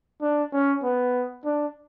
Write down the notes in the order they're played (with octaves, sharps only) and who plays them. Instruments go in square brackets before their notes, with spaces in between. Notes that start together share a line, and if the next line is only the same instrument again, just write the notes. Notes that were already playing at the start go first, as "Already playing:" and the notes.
[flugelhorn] D4
C#4
B3
D4